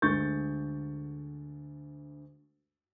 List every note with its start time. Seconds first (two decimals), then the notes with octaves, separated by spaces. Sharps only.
0.02 D2 D3 G#3 C#6 G6 A6